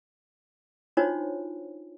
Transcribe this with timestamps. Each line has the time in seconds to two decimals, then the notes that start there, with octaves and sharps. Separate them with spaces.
0.97 D4 D#4 F4 F#4 C5 C#5